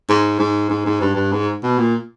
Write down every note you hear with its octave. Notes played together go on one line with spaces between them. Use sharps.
G#2
G#2
G#2
G#2
G2
G2
G#2
B2
A#2